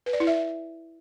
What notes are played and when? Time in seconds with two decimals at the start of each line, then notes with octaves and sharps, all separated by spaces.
0.06 B4
0.13 D5
0.20 E4
0.27 E5